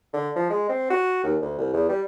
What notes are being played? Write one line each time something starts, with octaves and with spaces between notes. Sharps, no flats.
D3
F3
G#3
C4
F#4
D#2
D2
C2
E2
G3